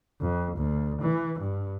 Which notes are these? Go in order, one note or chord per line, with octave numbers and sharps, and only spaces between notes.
F2
D2
E3
G2